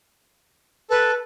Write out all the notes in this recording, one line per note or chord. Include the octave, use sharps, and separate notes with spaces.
A4 B4